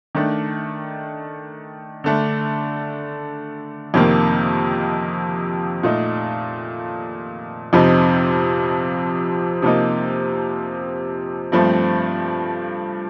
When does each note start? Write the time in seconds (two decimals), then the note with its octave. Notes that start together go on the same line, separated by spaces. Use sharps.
0.15 D#3 A3 D4
2.04 D3 A3 D4
3.94 F2 C3 D#3 A#3
5.83 A#2 A3 D#4
7.73 F2 C3 F3 C4 D#4
9.62 C3 F3 A#3 D#4
11.52 G2 F3 A3 C4